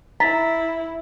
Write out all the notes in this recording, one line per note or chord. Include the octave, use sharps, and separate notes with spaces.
E4 A#5 A6 B6